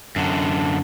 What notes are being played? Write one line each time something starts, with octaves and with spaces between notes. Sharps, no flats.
F#2 D3